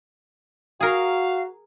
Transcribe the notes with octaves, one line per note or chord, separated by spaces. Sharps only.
F#4 G#4 A#4 F5